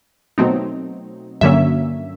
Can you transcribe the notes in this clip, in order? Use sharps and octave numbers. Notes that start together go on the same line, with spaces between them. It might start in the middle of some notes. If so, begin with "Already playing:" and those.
B2 F#3 A3 C4 D#4
G2 D3 F#3 A#3 C#4 E5